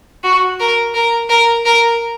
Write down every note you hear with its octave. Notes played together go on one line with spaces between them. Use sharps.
F#4
A#4
A#4
A#4
A#4